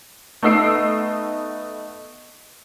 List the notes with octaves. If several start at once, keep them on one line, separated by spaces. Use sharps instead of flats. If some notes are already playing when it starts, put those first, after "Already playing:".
A3 B3 D#4 E6 C7 D7